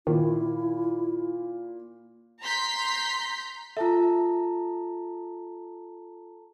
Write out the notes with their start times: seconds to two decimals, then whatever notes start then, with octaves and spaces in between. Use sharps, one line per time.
0.07 A#2 D#3 E4
2.41 A#5 C6 G6 B6
3.77 F4 A4 E5 A5 A#5